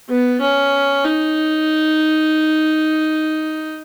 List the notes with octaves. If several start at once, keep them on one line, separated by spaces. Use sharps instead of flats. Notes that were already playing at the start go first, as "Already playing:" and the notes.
B3
C#4
D#4